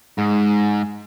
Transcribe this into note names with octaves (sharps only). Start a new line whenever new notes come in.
G#2